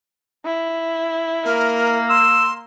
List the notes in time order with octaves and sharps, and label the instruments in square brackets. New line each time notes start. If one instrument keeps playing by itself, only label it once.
[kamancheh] E4
[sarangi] A#3 [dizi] A#4
[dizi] C6 [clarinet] E6